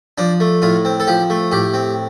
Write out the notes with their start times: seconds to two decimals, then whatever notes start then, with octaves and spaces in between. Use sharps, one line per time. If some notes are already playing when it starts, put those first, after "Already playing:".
0.18 F3 D4
0.40 A3
0.62 A2 F4
0.85 C4
1.00 A4
1.07 F3 G4
1.30 A3
1.52 A2 G4
1.74 C4